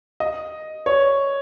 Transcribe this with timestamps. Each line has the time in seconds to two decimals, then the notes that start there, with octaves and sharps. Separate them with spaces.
0.20 D#5
0.86 C#5